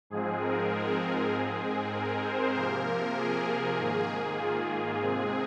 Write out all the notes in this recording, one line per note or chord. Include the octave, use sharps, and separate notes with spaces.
G#2 F3 G#3 C4 G#4
A#4
A#4
G#2 G#3 C4 G#4
A#4
C5
C3 F3 A#3 A#4
G#4
G#2 D#3 A#3
F4
C3 G#3 C4 G#4